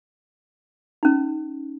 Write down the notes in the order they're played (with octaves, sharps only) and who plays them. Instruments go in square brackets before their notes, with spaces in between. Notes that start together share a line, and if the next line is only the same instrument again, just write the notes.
[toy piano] C#4 D#4